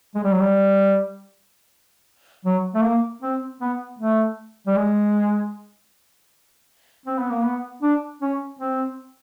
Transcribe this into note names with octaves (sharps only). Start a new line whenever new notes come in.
G#3
G3
F#3
G3
F#3
A3
A#3
C4
B3
A3
G3
G#3
C4
B3
A#3
B3
D4
C#4
C4